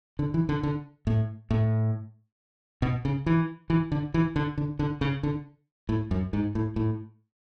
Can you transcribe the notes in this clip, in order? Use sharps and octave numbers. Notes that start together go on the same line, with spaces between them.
D3
E3
D3
D3
A2
A2
B2
C#3
E3
E3
D3
E3
D3
D3
D3
C#3
D3
A2
F#2
G#2
A2
A2